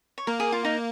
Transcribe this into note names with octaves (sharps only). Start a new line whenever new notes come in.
C#5
A#3 A#4
G#4
F4
D#4